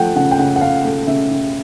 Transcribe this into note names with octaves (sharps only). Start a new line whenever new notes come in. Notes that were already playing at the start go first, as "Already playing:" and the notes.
Already playing: F3 A3 F#5 G5
C#3 F#5
G5
C#3 F#5
F#5
C#3 F5
A3
C#3 E5
C#3